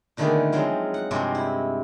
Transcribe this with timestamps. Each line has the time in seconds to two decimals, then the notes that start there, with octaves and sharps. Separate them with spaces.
0.17 A#2 D3 D#3 A3 B3 G#4
0.52 F3 F#3 G#3 C4
0.94 F#5
1.11 G2 C3 F3 G#3 C4 F#4
1.35 E4